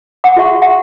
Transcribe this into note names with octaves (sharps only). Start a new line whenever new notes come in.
F#5 D6
F#4 G#4 E5 C#6
E5 F#5